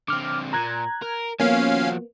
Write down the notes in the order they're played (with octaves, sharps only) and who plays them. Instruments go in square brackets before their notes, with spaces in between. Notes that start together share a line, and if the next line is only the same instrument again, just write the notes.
[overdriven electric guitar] D3 C4 [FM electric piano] D6 F6
[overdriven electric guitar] A#2 [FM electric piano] A#5 F#6 G#6
[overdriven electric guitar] A#4
[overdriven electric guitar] F3 F#4 [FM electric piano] A#3 B3 [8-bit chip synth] C#4 F5